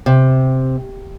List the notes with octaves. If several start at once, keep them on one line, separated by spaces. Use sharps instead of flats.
C3